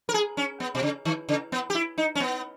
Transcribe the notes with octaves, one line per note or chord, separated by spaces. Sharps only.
A#4
G#4
C#4
B3
B2
C#3
D#3
C#3
B3
G4
E4
D#4
C#4
B3